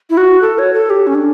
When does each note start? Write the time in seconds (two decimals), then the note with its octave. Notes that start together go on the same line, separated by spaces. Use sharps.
0.10 E4
0.17 F#4
0.42 A4
0.58 C#5
0.74 A4
0.90 G4
1.07 C#4
1.14 D4